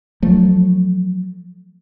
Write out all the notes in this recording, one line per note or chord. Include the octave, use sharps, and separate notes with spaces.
F3 F#3 A3